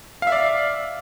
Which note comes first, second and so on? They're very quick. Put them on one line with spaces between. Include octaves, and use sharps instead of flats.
F5 E5 D5